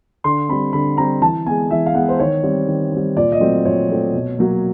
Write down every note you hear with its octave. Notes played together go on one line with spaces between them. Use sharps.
D3 C6
G3 C4 B5
D3 B5
G3 C4 A#5
E3 A5
G#3 B3 G#5
E3 E5
F5
G#3 B3 F#5
C5
D#3 C#5
G3 C4
D#3
G3 C4
A#2 D5
D#5
F#3 A3 C4
A#2 C#5
F#3 A3 C4
B2
F#3 A#3